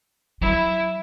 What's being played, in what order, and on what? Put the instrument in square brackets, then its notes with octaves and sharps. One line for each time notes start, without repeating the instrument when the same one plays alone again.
[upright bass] F#3 [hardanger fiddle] E4